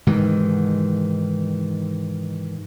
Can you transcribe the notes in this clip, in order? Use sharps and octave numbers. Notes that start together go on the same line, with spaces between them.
G#2 C3 D#3 E3